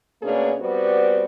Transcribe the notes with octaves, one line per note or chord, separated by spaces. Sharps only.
B2 A3 A#3 C#4 D4 G#4
G3 B3 C4 F#4 B4 D5